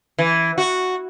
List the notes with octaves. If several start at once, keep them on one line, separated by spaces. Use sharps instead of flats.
E3
F#4